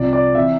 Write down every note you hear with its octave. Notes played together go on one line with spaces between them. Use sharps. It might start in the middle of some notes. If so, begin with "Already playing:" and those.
Already playing: C2 C3 F3 D5
D5
C3 E3 E5